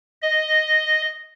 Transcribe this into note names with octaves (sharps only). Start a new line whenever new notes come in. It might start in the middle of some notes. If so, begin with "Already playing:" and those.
D#5